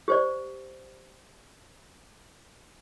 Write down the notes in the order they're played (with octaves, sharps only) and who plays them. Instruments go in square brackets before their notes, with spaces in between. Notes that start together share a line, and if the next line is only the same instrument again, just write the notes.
[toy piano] G4 C5 D5